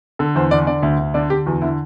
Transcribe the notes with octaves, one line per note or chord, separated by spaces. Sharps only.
D3 A4
E2 C5
D3 D5
D3 D5
D2
D2
D3 D5
D3 G4
E2 F#4
D3 E4